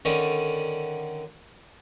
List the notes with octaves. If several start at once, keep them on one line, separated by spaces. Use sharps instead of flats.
D3 D#3 C#4